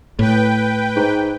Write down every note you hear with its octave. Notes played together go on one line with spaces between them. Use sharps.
A2 B4 G5
G#2